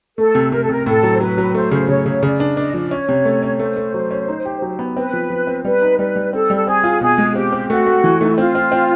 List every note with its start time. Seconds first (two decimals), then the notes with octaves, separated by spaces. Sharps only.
0.17 A3 A4
0.35 C3
0.52 C3 A#4
0.62 A4
0.69 C3 A#4
0.86 A2 A4
1.03 F#3
1.11 C5
1.20 F#3 B4
1.38 F#3
1.54 A3 C5
1.71 C#3 C5
1.89 C#3 C#5
2.06 C#3 C#5
2.23 C#3 D5
2.40 D4
2.57 D4 D#5
2.74 F3 D5
2.91 C#4 C#5
3.09 C3
3.25 A3
3.43 C#4
3.59 A3 C5
3.76 A3
3.94 F#3
4.11 C#4
4.28 D#4
4.45 G4
4.62 F#3
4.79 B3
4.96 C4 B4
5.13 F3
5.30 F3
5.47 C4
5.64 G3 B4
5.82 D#4
5.98 G3 B4
6.16 G3
6.33 C4 A4
6.50 G3
6.55 A4
6.67 C4 G#4
6.84 F4
7.01 B2 G#4
7.18 G#3
7.35 C4 G4
7.52 C4
7.69 A3 F#4
7.86 A3
8.04 E3
8.19 A3 D#4
8.28 E4
8.38 C4 F4
8.55 C4
8.72 C4